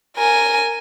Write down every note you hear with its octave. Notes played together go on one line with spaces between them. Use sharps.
A#4 G#5